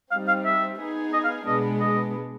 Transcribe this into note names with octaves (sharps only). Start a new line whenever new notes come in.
G3 C4 D#4 F5
F5
E5
B3 D#4 G#4
D#5
F5
B2 G#3 B3 D4 D#5
D#5